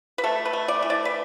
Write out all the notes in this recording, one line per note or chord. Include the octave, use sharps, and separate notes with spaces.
B4
A3 A4
B4
A3
D5
E3
D5
B4